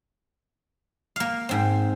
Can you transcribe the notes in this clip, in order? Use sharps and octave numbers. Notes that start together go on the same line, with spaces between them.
A#3 F5
G#2 C4